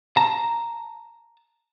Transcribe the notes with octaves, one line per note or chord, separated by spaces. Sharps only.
A5 A#5